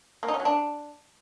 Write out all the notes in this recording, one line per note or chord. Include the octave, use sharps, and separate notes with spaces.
A#3
D#4
C#4
F#3
D4